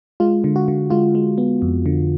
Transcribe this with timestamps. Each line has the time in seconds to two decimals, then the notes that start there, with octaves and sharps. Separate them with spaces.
0.20 G#3 F4
0.44 D3
0.56 F#4
0.68 D3
0.90 G#3 F4
1.15 G#3
1.38 B3
1.62 F2
1.86 D3